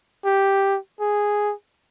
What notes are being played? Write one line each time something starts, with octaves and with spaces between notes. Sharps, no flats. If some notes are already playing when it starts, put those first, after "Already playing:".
G4
G#4